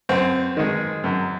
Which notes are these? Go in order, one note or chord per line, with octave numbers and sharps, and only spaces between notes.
F#2 C4
D#3 G#3
F#2